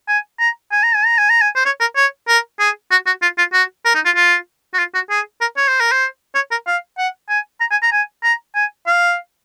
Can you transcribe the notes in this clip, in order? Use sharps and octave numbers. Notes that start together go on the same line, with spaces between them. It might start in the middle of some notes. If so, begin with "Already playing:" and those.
G#5
A#5
G#5
A#5
G#5
A#5
G#5
A#5
G#5
C5
C#5
A#4
C#5
A#4
G#4
F#4
F#4
F4
F4
F#4
A#4
D#4
F4
F4
F#4
F4
F#4
G#4
A#4
C#5
C5
A#4
C5
C#5
A#4
F5
F#5
G#5
A#5
G#5
A#5
G#5
A#5
G#5
F5